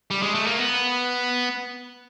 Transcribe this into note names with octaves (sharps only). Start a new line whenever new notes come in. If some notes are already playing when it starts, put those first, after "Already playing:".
G3
G#3
A3
A#3
B3